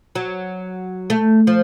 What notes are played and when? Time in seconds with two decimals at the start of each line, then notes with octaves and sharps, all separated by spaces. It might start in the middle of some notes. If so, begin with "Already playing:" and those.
0.15 F#3
1.10 A3
1.47 F3